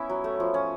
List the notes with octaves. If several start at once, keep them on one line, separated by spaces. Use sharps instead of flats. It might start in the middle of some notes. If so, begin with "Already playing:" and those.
Already playing: B3 C#4 E4 E5
F#3
A3
F3
C#4